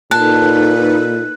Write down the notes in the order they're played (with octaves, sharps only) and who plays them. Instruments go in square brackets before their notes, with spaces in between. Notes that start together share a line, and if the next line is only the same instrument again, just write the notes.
[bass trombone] A#2 [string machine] D#4 A4 B4 [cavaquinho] A5 [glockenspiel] F#6